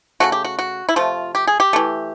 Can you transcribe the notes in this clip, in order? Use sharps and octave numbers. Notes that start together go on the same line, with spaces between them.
C#3 F3 A3 F#4
G4
F#4
F#4
E4
C3 F3 A3 F4
G4
G#4
G4
E3 A3